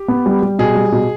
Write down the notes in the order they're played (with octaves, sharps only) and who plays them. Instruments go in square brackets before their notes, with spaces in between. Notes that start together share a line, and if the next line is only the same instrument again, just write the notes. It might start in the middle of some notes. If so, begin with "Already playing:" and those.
Already playing: [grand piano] G4
[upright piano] B3
G3
G3
[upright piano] B2 [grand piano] G#4
[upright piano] G3
B2